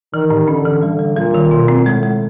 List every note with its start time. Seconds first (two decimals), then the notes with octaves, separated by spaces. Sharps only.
0.14 D#3 E3
0.30 A2
0.48 D3 C#4
0.66 E3
0.83 D3 G3
0.99 G3
1.17 A#2 G3
1.34 D#3
1.51 B2
1.68 C4
1.86 A2 G#3
2.03 G#3